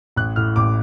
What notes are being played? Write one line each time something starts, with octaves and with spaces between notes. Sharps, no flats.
A1 F#6
A2 F6
A1 D6